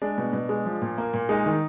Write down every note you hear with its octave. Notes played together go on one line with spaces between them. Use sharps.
G#3 D4
B2
B2
G#3
F3
A#2
A#3
A#2
G#3 D#4
D#3